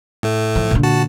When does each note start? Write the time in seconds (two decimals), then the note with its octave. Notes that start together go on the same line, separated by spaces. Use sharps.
0.23 A2 A3
0.56 F3
0.71 A#2 D3
0.83 F#4 A5